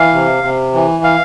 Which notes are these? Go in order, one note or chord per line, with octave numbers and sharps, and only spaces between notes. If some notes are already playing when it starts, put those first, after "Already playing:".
Already playing: E3 F5
C3
C3
E3
F5